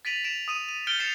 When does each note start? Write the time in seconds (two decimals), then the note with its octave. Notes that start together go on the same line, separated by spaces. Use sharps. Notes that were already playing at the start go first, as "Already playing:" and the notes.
0.05 A6 B6 D7 D#7 F7 F#7
0.24 A6 D7 E7 F7
0.48 D#6 D#7 E7
0.69 D#7
0.87 F6 G6 A6 C#7 D7 G7
0.99 A6 C7 C#7 E7 F7